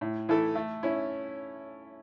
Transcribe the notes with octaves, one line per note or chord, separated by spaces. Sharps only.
A2
E3 A3 E4 A4
A3
C#4 E4